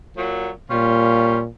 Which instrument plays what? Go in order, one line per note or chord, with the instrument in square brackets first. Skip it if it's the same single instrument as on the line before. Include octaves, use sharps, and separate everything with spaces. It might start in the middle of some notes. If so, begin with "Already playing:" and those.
[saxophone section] A#2 F#3
[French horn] A#2 [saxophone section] G3 C#4 F4